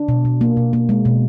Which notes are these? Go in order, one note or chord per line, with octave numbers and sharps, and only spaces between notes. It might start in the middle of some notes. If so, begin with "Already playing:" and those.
Already playing: D4
B2
B2
A#3
B2
A#3
G#3
B2